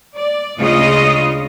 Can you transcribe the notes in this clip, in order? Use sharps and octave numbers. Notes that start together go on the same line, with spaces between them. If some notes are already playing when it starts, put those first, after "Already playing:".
D5
D2 C#3 G#3 F4 D#5